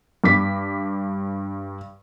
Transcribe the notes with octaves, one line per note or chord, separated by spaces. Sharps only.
G2 D6 B6